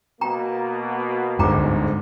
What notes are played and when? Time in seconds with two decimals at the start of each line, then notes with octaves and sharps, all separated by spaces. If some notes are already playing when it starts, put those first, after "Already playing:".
0.21 B2 A#3 B3 G5 A#5
1.39 D1 G1 G#2 G5 A#5 D6